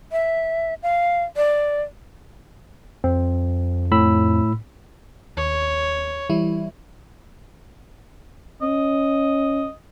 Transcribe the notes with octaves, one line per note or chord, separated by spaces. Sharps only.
E5
F5
D5
F2 C4
A2 B5 E6
D#2 C#5
E3 G3 E4
C#4 D#5